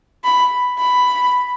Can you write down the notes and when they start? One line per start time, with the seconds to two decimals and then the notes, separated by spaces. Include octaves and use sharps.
0.24 B5
0.78 B5